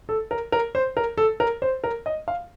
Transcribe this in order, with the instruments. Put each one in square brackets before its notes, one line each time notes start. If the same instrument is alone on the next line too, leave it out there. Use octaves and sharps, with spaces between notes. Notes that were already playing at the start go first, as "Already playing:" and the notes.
[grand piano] A4
A#4
A#4
C5
A#4
A4
A#4
C5
A#4
D#5
F5